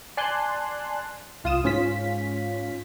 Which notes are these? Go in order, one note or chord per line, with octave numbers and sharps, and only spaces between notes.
D5 G#5 A5 C6 F#6
C2 F4 F5 D#6 E7
G#2 C#4 F4 B6